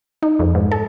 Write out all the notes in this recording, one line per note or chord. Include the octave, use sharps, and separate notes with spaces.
D#4
F2
G#2
A4